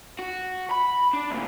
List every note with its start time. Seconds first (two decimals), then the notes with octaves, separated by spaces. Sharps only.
0.19 F#4
0.71 B5
1.13 D4
1.31 D2 A#2